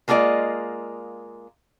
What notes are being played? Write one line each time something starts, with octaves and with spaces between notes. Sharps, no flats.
G#3 A#3 F4 G4 D5 D#5